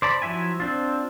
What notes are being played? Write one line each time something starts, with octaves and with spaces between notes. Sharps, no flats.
C5 D5 A5 B5
F3 F#3 E4 E5 G#5
C4 D4 F4